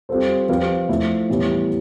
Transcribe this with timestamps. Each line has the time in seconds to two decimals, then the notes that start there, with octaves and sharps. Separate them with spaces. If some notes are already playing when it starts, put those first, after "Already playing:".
0.09 G3 C4 F4 A4 C5
0.49 F3 C4 G4 B4 F5
0.89 F3 A3 E4
1.29 A2 E3 G3 B3